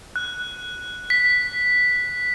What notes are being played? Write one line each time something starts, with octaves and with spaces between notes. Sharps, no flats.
F#6
B6